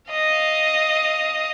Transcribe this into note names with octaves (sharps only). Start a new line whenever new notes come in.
D#5 F5